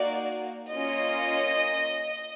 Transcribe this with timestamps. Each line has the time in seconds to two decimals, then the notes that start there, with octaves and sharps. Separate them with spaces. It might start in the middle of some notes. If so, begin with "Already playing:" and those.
Already playing: A#3 D#4 F#4 D5
0.73 A#3 C#4 F4 D#5